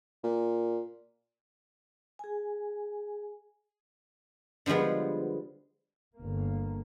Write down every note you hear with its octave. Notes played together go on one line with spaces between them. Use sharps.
A#2
G#4 G#5
D3 F3 G3 G#3 B3
G1 A#3